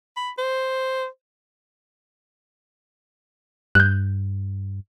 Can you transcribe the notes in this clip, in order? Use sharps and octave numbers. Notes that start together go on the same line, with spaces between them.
B5
C5
G2 F#6 G6